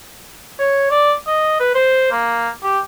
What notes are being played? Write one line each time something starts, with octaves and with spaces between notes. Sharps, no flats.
C#5
D5
D#5
B4
C5
A#3
G4